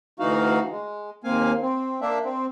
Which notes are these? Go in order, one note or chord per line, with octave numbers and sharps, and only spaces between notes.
D2 E3 D#4 F#4 F5
G#3
D#2 A#3 C4 F5 G#5
C4
A#3 D4 E5
C4